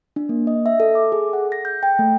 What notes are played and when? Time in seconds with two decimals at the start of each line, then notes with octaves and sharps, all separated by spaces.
0.16 D4
0.29 A#3
0.47 D#5
0.66 E5
0.80 A4
0.95 D6
1.12 G#4
1.33 F#5
1.52 A#6
1.65 G6
1.83 G5
1.99 A3